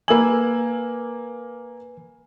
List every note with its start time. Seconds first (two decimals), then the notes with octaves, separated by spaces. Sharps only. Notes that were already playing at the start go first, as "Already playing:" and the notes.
0.08 A#3 B4 G#5 E6 F#7